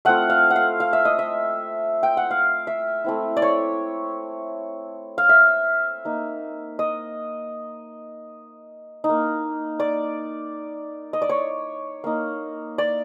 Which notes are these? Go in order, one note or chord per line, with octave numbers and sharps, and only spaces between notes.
A3 C4 F4 F#5
F5
F#5
F5
F5
E5
D#5
E5
G5
F#5
F5
E5
A3 C4 E4
D5
C#5
F5
E5
A#3 D#4
D#5
D#4
A#3
D5
D#5
D5
C#5
A#3 D#4
D5